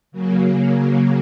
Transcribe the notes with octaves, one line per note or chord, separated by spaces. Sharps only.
C#3 F#3 A#3